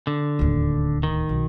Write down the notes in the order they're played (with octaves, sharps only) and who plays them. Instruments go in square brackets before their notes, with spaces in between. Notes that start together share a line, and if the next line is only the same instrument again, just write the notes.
[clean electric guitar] D3
[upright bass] D1 D#2
[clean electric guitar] D#3
[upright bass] B1